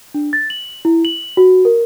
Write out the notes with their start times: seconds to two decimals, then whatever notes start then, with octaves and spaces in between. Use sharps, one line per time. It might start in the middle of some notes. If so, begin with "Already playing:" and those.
0.14 D4
0.33 A6
0.50 F#7
0.85 E4
1.05 F#7
1.37 F#4
1.65 A#4